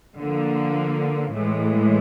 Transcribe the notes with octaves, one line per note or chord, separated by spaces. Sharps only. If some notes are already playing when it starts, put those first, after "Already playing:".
D3 F3 A#3
A2 E3 G#3